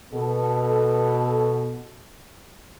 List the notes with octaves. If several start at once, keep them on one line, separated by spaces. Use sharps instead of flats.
B2 A4